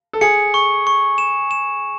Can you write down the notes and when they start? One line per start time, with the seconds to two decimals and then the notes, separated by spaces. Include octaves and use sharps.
0.13 A4
0.21 G#4 C#7
0.54 C#6
0.87 C#6
1.18 E7
1.51 E7